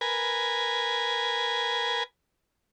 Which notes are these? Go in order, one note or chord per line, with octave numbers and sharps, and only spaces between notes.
A#4 B4 G#5